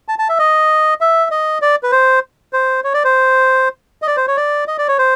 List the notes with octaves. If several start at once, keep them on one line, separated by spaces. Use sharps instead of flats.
A5
A5
E5
D#5
E5
D#5
D5
B4
C5
C5
C#5
D5
C5
D#5
D5
C5
C#5
D5
D#5
D5
C#5
C5